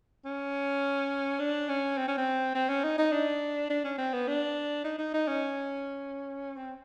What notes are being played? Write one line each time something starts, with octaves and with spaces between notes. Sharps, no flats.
C#4
D4
C#4
C4
C#4
C4
C4
C#4
D#4
D#4
D4
D4
C#4
C4
B3
D4
D#4
D#4
D#4
C#4
C4